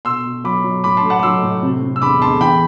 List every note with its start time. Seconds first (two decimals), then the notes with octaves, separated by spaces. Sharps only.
0.05 B2 C6 E6
0.25 B2
0.44 F#3 B5 D6
0.64 F#3
0.84 A2 B5 D6
0.97 A5 C6
1.04 A3
1.10 F#5 A5
1.19 D6
1.23 F#3 C6 E6
1.43 A2
1.63 C3
1.83 C3
1.96 E6
2.02 E2 B5 D6
2.22 E2 A5 C6
2.41 E3 G5 B5